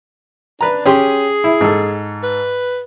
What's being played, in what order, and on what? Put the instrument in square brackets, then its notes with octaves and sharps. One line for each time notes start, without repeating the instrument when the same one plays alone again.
[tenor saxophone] D4 [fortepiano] B4 A#5
[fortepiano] C#4 G4 C6 [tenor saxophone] G#4
[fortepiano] E4
G#2 A4
[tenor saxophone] B4